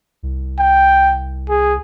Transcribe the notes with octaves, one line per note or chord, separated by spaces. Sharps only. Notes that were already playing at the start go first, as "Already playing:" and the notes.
C2
G5
G#4